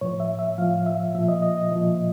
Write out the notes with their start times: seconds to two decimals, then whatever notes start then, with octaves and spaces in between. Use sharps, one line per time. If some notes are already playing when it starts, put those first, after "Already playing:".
0.01 A2 F3 C#5
0.20 E5
0.39 E5
0.58 A2 F3 F5
0.86 E5
1.15 A#2 F3 E5
1.28 D#5
1.42 D#5
1.57 D#5
1.71 A#2 F3